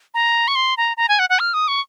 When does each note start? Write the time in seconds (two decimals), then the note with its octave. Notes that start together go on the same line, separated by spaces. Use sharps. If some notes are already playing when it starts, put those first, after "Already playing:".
0.14 A#5
0.48 C#6
0.55 C6
0.77 A#5
0.97 A#5
1.09 G#5
1.19 F#5
1.29 F#5
1.39 F6
1.54 D#6
1.68 C#6